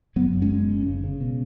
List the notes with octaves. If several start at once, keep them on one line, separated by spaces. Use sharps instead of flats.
F#1 F#3 B3
F#2
G#3 C#4
F#1
F#1
C#3
C#3
B2